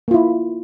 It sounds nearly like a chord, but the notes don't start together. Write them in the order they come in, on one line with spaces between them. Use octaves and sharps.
A#3 F4 E4